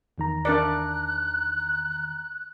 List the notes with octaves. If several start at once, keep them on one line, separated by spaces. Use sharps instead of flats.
E2 D#3 A#5
D4 A#4 D5 F#6